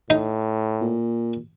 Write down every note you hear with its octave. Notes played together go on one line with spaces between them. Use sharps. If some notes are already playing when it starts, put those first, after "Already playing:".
A2 D#4
A#2